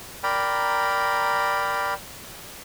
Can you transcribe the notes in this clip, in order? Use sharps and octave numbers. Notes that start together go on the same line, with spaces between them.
A#4 D5 G5 A#5 B5